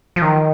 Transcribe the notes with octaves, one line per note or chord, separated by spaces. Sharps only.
F3
D#3